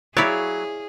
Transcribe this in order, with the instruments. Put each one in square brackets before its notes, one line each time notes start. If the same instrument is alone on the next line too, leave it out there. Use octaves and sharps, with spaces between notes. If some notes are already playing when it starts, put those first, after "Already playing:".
[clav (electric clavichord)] F#3 [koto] E4 D5 [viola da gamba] G#4 [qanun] C#5 F5 B5